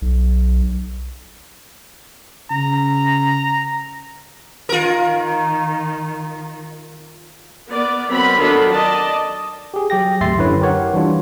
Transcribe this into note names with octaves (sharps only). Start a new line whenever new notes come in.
B1
C#3 A#5
D#3 F4 A#4
B3 A#4 D5
F#3 B3 C4 A#4 B5
D#3 F#3 D4 F4 A4 B5
D5 D#5 A5
G4 G#4
F#3 G4 G5 A#6
G#1 D2 E5 C6 A6 C7
F#2 D3 E4 G4 B4 C#5
G4 A#4 C#5 F#5
E3 G3 D4 F4